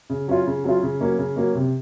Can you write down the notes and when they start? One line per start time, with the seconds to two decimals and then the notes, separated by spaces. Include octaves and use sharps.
0.10 C#3
0.28 F#3 C#4 F4
0.47 C#3
0.64 F#3 C#4 F4
0.83 C#3
1.01 F#3 A#3 C#4
1.18 C#3
1.36 F#3 A#3 C#4
1.55 C3